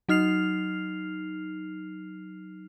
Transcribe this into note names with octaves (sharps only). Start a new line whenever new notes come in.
F#3 D#4 F6 C7 F7